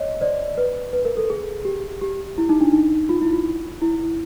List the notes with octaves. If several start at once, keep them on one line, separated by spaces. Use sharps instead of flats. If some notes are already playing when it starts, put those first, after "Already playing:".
Already playing: C#5 D#5
C5 D5
B4
B4
A#4
A4
G#4
G4
G4
E4
D#4
D4
D#4
F4
E4
F4
E4